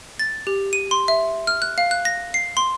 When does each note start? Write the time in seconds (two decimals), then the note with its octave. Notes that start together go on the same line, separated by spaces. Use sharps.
0.19 A6
0.47 G4
0.73 D#7
0.91 C6
1.08 E5
1.47 F6
1.62 F#6
1.78 F5
1.91 F#6
2.05 A#6
2.34 C7
2.57 C6